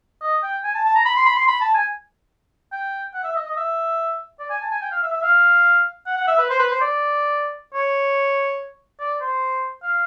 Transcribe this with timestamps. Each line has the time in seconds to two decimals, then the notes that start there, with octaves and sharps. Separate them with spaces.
0.21 D#5
0.43 G5
0.64 G#5
0.74 A5
0.84 A5
0.95 A#5
1.05 B5
1.16 C6
1.25 B5
1.36 C6
1.47 B5
1.61 A5
1.74 G#5
2.72 G5
3.14 F#5
3.24 E5
3.35 D#5
3.46 D#5
3.57 E5
4.39 D5
4.50 G#5
4.61 A5
4.71 G#5
4.82 G5
4.91 F5
5.02 E5
5.13 E5
5.23 F5
6.06 F#5
6.17 F#5
6.27 E5
6.38 B4
6.49 C5
6.59 B4
6.70 C5
6.81 D5
7.74 C#5
9.00 D5
9.21 C5
9.83 F5